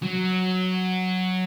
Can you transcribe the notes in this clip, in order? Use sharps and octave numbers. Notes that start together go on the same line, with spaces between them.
F#3